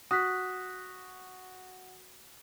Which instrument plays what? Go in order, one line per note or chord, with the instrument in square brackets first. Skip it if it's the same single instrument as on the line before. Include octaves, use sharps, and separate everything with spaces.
[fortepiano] F#4 [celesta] D#6 F#6 B6